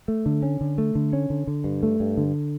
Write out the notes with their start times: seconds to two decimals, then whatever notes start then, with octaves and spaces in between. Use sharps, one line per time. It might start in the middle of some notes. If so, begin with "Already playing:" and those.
0.08 A3
0.26 D3
0.43 C#4
0.61 D3
0.78 A3
0.95 D3
1.13 C#4
1.30 D3
1.47 D3
1.64 G2
1.83 A3
2.00 G2
2.17 D3